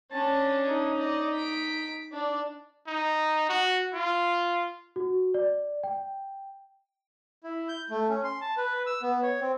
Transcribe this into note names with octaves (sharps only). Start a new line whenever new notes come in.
C#4 D4 A5
D#4
D5 D#5
B6 D7
D4 D5
D#4
F#4
F4
F#4
D5
G5
E4
G6
A3
C#4
C6
A5
B4
E6
B3
C#5
C4